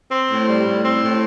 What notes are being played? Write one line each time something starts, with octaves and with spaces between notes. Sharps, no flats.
C4
A2
G3
A2
C4
A2